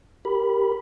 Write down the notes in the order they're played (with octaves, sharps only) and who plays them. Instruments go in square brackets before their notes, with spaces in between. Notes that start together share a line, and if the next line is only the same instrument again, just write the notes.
[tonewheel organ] G4 A#4 B5